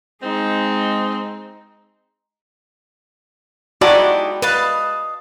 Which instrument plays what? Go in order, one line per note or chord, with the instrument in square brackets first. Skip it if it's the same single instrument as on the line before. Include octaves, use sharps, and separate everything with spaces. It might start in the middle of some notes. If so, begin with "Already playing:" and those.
[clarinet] G#3 [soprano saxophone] C4 [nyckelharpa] D#4 G#4
[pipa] G#3 A4 D5 [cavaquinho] D#4 E4 G4 [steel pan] F#4
[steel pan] B4 [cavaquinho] D#5 F5 A5